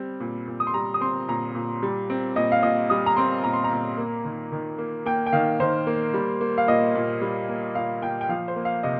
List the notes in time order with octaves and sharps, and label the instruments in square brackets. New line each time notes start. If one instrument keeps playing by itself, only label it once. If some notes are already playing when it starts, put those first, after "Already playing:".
Already playing: [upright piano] G3 C4
A#2
A#2
D#6
C6
G3 A#5
D#6
C4 C6
A#2 A#5
A#2
G3
C4
A#2 D#5
F5
A#2 D#5
G3 D#6
A#5
C4 C6
A#2 A#5
C6
A#5
A#2
A#3
D#3
D#3
A#3
A#3 G5
G5
D#3 F5
D#3 C5
A#3
G3
A#3
F5
A#2 D#5
A#2
G3
A#3
A#2 F5
A#2 G5
G5
F3 F5
C5
A#3
F5
C3 D#5